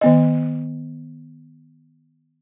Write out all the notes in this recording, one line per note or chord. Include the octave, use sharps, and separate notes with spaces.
D#3 B3 D#5